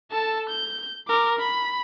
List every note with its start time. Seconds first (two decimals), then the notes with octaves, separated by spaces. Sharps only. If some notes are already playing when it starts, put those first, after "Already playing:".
0.12 A4 A5
0.49 G6
1.08 A#4 D6
1.39 B5